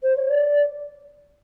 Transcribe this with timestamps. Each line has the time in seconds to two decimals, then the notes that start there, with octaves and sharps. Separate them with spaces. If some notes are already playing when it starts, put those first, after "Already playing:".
0.03 C5
0.16 C#5
0.29 D5